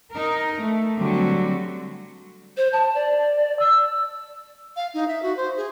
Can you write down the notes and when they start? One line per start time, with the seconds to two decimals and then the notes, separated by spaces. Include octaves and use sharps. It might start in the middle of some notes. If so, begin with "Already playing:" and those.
0.12 D#4 A#4
0.60 A3
0.97 D3 F#3 G3 C4 F#4
2.57 C5
2.73 A5
2.94 D5
3.59 E6
4.76 F5
4.94 D#4
5.08 E5
5.23 F#4
5.37 C5
5.57 G#4